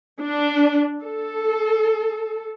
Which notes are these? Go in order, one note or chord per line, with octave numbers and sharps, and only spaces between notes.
D4
A4